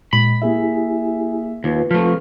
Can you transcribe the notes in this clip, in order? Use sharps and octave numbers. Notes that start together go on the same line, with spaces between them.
A#2 G#3 B5
A#3 E4 G4 G#4 E5 G#5
D#2 F4 B4
F3 A3 F6